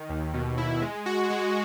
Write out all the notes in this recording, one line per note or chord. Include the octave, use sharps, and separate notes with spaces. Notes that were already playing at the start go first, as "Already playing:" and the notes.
Already playing: D#3
D#2
B2
E4
G#3
F#4
G#3